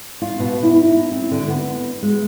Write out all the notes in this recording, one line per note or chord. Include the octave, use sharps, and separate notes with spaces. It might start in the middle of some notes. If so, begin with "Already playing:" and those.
F4
B2
E4
D#4
C4
D3
B3
G#3